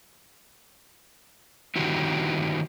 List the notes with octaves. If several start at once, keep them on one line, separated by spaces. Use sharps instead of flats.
D3 D#3 E4 F#4 G4